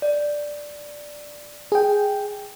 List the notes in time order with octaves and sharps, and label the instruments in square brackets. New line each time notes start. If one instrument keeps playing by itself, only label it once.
[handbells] D5
[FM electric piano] G#4 G5